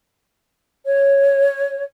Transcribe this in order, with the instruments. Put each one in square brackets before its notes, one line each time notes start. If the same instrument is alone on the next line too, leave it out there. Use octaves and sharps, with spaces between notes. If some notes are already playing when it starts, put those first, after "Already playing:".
[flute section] C#5